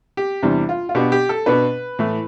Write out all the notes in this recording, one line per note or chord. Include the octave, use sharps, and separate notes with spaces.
G4
E2 C3 E3 G3 D4
F4
F4
B2 B3 D4 G4
G4
A4
B2 B3 D4 B4
A2 E3 A3